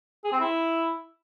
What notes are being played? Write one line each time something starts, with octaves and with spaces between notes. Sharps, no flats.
G#4
C4
E4